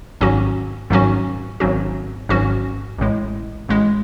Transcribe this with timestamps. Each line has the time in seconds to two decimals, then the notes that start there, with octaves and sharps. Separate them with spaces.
0.21 G#1 G#2 F#3 C#4 F#4
0.90 G#1 G#2 F#3 C#4 F#4
1.60 G#1 G#2 F#3 C#4 F#4
2.29 G#1 G#2 F#3 C#4 F#4
2.99 A1 A2 G#3
3.69 A1 A2 G#3